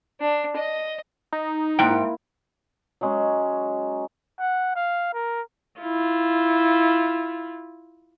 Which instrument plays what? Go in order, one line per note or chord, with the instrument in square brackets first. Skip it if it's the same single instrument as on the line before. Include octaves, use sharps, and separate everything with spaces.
[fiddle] D4
D#5
[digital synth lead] D#4
[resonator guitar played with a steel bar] G#2 G5 [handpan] A#3 E4
[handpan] E4
[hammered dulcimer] F#3 G#3 C#4
[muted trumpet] F#5
F5
A#4
[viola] E4 F4